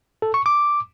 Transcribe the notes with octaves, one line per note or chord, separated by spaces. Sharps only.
A4
C#6
D6